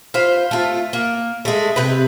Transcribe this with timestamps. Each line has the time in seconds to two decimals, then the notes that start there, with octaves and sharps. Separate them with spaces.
0.14 F4 B4 C5
0.51 A3 F4
0.93 A#3
1.45 G#3 A3
1.76 C3 B4